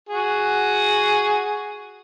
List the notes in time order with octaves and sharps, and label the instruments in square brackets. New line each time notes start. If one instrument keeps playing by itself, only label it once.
[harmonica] F#4 G#4